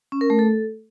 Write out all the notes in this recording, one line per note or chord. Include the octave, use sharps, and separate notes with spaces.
C#4
A#4
A3
A4